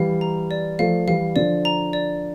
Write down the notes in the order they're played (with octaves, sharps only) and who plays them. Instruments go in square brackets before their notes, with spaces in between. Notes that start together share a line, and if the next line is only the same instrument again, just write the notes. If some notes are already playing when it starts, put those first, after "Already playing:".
Already playing: [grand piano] E3 G3 [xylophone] F5
[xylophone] A#5
D5
[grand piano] F3 A3 [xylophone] F5
[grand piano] E3 G3 [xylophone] F5
[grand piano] D3 F3 [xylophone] D5
[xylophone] A#5
D5